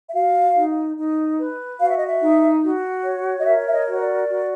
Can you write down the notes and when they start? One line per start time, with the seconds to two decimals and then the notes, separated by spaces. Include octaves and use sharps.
0.08 E5
0.14 F#4 F5
0.55 D#4
0.97 D#4
1.39 B4
1.79 F#4 F5
1.89 E5
1.97 D#5
2.06 E5
2.21 D#4
2.62 F#4
3.04 C#5
3.40 D#5
3.45 A#4 E5
3.67 E5
3.73 D#5
3.86 F#4
4.00 D5
4.28 F#4